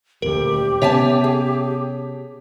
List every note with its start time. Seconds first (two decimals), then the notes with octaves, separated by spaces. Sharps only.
0.22 D#1 D2 G4 A#4
0.82 C3 B3 C#4 C#5 E5 G#5 A5 B6
1.24 G#4